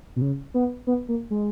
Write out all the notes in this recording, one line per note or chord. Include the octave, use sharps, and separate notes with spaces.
B2
C#3
B3
B3
A#3
G#3